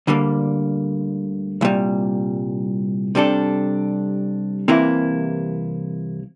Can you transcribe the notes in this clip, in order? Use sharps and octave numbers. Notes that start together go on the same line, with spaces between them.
D2 D3 G3 A#3
C2 A#2 G3
C3 G3 D4 A4
C2 C3 E3 A#3 E4